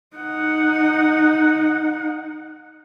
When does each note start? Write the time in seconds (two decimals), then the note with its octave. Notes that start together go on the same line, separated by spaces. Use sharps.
0.16 D#4 F#5